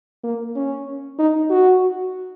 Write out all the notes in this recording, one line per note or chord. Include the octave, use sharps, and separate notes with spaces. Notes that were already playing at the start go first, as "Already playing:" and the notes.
A#3
C#4
D#4
F#4